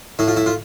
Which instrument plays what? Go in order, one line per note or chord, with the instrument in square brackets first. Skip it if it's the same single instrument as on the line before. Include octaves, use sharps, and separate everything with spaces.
[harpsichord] A2 E4
F4
E4
F4